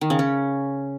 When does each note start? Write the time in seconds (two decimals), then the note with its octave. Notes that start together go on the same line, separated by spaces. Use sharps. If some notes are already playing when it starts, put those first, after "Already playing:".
0.01 D#3
0.10 C#3
0.19 C#4